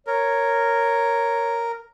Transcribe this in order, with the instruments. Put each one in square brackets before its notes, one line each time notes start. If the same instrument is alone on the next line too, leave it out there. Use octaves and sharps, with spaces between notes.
[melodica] A#4 [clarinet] C#5